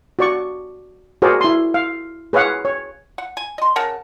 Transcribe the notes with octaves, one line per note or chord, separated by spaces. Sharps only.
F#4 D5 C#6
F#4 G#4 A#4 C5 D5
E4 C6
F5
G#4 B4 C#5 F5 F#5
C#5
F#5
G#5
D#5 C6
C#3 A#4 F#5 A5